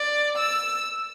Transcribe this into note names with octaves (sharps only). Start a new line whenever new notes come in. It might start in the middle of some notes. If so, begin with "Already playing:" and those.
Already playing: D5
E6